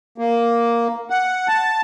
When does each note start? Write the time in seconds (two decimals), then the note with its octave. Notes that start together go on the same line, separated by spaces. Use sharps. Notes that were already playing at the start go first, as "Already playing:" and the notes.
0.18 A#3
1.10 F#5
1.48 A5